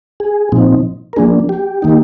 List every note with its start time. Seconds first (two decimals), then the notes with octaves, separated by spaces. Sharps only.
0.20 G#4
0.52 A#2 F3 C4 D#4
1.13 A#4
1.16 F3 A#3 D4 G#4
1.49 G4
1.82 D#3 A#3 D#4